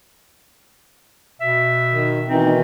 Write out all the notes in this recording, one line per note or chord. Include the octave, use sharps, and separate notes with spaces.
B2 E5
D#3
B2 D#3 E3 C4 D#4